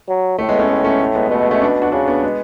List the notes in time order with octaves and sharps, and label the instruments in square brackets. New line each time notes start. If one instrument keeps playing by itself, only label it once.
[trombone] F#3
[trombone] A2 [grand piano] A3
[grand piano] G#3 B3
A3 C#4
[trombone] A2
[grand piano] A3 C#4
A3
G#3 B3
G#3
[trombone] B2 [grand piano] A3
[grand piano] G#3 B3
A3 C#4
B3 D4
D4 F#4
[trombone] C#3 [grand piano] D4 F#4
[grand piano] B3 D4
G#3 B3